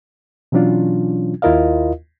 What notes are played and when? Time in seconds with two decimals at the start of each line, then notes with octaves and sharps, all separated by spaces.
0.52 B2 E3 F#3 C#4 D4 F4
1.42 D#2 E4 F4 A#4 D#5 F5